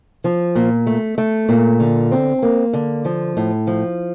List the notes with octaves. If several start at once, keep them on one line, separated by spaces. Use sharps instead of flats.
F3
A#2
A3
A3
A#2
D3
C4
A#3
D3
F3
A2
F3